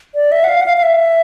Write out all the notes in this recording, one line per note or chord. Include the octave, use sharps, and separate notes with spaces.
D5
E5
F#5
F5
F#5
F5
F5
E5